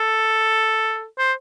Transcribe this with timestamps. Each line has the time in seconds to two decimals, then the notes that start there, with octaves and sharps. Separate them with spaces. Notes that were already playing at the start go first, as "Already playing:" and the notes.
Already playing: A4
1.18 C5